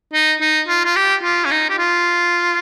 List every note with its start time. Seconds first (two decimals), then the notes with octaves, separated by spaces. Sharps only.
0.14 D#4
0.41 D#4
0.68 F4
0.85 F4
0.96 G4
1.23 F4
1.45 C#4
1.51 D#4
1.70 G4
1.78 F4